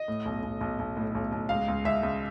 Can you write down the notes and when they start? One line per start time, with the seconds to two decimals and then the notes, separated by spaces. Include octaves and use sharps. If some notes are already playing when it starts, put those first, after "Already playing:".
Already playing: D#5
0.08 A2
0.26 B1
0.43 B1
0.61 B1
0.79 B1
0.97 A2
1.15 B1
1.32 B1
1.49 C#2 F5
1.68 C#2
1.85 C#2 E5
2.03 C#2